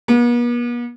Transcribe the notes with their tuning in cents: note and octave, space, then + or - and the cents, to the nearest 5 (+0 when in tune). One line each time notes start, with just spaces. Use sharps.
B3 -45